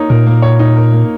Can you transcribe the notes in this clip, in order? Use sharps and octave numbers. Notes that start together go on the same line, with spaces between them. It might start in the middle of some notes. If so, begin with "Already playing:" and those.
Already playing: A#3 D#4 C#5
A#2 A#4
A#3
C#5
D#4
A#4
A#3